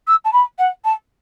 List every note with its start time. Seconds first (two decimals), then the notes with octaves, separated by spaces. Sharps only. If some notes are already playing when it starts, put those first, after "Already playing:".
0.07 E6
0.25 A5
0.33 B5
0.58 F#5
0.85 A5